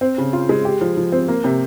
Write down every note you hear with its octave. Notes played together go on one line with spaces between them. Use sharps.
C4
C#3
F4
G#3
G4
F3
F3
C4
A#3
C3